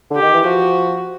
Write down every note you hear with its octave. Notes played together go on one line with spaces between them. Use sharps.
D3 G4
D#3
E3
F3 F#4